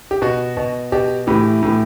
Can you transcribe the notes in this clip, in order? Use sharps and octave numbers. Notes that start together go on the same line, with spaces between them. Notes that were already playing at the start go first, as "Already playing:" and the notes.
G4
B2 F#4
B2
B2 G4
A2 E3 G4
A2 E3